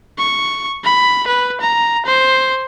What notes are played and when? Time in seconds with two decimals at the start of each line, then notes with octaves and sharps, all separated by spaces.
0.19 C#6
0.84 B5
1.27 B4
1.61 A#5
2.06 C5